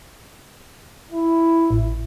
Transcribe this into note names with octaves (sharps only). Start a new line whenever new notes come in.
E4
A1